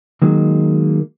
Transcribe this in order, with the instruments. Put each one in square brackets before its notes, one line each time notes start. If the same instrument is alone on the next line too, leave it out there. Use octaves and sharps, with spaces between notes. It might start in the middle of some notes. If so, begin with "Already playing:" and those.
[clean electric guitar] D#3 F#3 G#3 A#3